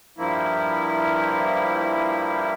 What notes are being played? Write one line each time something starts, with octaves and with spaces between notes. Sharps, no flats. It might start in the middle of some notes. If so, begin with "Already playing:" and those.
G2 F3 A#3 E4